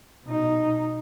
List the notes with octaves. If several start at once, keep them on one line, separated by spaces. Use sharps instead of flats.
B2 D#4